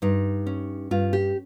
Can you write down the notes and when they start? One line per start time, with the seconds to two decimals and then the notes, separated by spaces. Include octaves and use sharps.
0.02 G2 D#4
0.46 C#4
0.91 G2 F4
1.13 G4